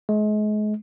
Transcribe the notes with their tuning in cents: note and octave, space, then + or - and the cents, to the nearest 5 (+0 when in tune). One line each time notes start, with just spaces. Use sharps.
G#3 +35